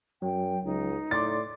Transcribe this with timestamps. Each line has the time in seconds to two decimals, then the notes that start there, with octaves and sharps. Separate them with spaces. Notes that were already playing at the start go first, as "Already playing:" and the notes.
0.22 F#2 F#3 G5
0.65 C#2 D#4
1.11 A2 D5 C6 D6 A6